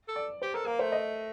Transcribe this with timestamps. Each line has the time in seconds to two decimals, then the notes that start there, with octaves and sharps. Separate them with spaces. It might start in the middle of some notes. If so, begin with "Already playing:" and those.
0.08 A4
0.16 D5
0.42 G4 C5
0.54 A4 A#4
0.66 A#3 A#4
0.79 A3 C5
0.92 D#5